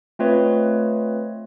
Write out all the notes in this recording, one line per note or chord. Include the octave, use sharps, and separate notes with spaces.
A3 C4 F4 B4 C#5 D#5